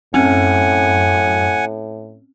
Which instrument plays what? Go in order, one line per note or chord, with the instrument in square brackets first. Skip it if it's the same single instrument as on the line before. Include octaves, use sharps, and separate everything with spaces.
[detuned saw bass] F#2 [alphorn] A2 [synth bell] C4 C#4 [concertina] F#5 G#5